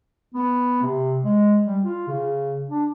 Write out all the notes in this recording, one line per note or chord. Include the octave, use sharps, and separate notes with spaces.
B3
C3
G#3
G3
F4
C#3
D4